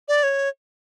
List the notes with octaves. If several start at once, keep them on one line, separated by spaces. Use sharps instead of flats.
D5
C#5